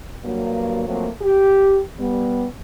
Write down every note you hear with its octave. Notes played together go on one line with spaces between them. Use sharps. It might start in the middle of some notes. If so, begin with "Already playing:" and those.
G2 F#3 A#3
F3 F#3 A3 A#3 C4
G4
G3 B3